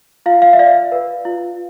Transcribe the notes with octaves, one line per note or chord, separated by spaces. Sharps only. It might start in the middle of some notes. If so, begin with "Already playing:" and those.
F4 F5
F5
E5
D5 F5
B4
F4